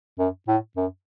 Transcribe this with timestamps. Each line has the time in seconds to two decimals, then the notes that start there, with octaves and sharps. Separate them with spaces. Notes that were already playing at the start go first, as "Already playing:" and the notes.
0.19 F#2
0.48 A2
0.77 F#2